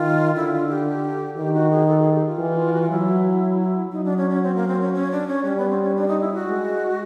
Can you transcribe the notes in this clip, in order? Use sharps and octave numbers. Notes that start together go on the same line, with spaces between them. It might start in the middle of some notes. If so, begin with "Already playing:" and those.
Already playing: D#3 F4
D3 E4
F4
G4
D#3 G4
F#4
G#4
A4
G#4
G4
F4
E3
F#4
F4
F#3 E4
F#3 D#4
D4
C#4
C#4
C4
A#3
C4
C#4
C#4
D4
C#4
G3 C#4
B3
C4
C#4
D4
D#4
E4
F#4
G#3